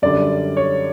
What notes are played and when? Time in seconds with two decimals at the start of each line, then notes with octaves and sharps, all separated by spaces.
0.02 F#2 D3 G3 D5
0.57 C#5